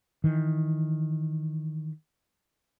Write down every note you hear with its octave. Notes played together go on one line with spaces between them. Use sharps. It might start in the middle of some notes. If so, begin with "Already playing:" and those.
D#3 E3